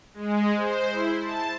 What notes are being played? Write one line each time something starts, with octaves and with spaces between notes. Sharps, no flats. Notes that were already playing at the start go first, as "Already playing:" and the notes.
G#3
C5
E4
A5